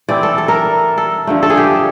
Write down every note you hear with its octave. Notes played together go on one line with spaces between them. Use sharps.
E3 A3 C4 E4 D5
A4
A4
A#4
A4
G2 D3 F3 A3
A4
G#4
G4